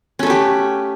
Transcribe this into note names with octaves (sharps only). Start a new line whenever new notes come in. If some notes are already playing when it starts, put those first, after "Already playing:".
A3 C#4 G4 B4